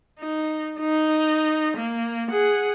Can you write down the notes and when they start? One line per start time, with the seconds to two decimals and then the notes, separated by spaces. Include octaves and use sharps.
0.20 D#4
0.80 D#4
1.77 A#3
2.30 G#4 F#5